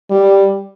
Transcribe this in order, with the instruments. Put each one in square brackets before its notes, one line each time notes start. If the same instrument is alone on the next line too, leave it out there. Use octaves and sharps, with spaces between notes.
[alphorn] G3